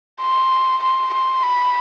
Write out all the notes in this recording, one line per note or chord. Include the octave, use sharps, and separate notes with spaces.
C6
C6
C6
B5